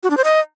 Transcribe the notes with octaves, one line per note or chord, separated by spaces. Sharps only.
F#4
D4
C5
D#5